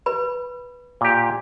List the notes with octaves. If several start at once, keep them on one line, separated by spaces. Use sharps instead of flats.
B4 B5
A#2 G4